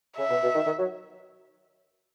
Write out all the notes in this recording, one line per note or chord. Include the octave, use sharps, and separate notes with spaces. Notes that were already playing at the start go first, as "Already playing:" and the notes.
C#3 E5
B2
B2
D#3
D#3
F#3